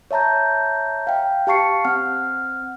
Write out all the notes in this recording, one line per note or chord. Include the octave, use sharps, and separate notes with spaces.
C#5 E5 A5 A#5 G6
F5 G5
G4 F5 A5 C#6 C7 C#7
C4 F#5 F6